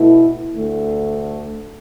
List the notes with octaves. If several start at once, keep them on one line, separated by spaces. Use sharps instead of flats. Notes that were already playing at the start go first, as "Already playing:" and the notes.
Already playing: B2 A3 E4
D2 D3 A3